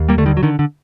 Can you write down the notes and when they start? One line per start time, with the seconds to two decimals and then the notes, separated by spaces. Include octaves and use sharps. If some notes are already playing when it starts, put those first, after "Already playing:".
Already playing: D#2
0.09 G3 A#3
0.18 D3 A3
0.26 D#3 G3
0.37 F#3
0.43 D3 D#3
0.59 D3